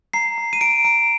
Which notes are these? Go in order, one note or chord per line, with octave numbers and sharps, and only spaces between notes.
A#5 C7
A#5
D#7
A#5 D7
A#5